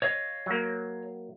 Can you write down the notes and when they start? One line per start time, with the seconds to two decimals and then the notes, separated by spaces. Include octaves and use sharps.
0.02 C#5 D#5 F5
0.46 F#3 A#3